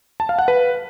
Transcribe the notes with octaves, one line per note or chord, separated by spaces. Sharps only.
A5
F5
F#5
B4